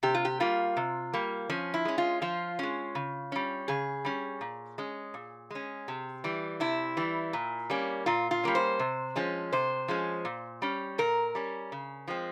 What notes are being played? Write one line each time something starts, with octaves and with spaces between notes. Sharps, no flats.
C3 G4
F4
G4
G3 A#3 F4
C3
G3 A#3
F3 C#4
E4
G#3 C#4
F4
F3 F4
G#3 C#4
C#3
G3 C#4
C#3 G#4
G3 C#4
A#2
G#3 C#4
A#2
G#3 C#4
C3
E3 G3
C3 E4
E3 G3
A#2
G3 A#3 C#4
A#2 F4
F4
G3 A#3 C#4
C5
C3
F3 G#3 C#4
C3 C5
F3 G#3 C#4
A#2
G3 C#4
A#2 A#4
G3 C#4
C#3
F3 G#3 C4